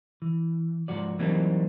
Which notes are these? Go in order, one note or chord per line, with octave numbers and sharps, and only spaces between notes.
E3
G#2 F3 F#4 D5
E3 F#3 G3 A#3 C4 D#4